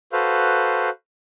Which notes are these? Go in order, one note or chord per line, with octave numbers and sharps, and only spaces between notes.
F#4 A4 B4 C5 F5